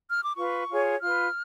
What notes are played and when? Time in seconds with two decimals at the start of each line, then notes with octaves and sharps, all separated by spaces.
0.11 F6
0.23 D6
0.36 F4 B4 C#6
0.69 F4 G#4 C#5
1.01 F4 B4 F6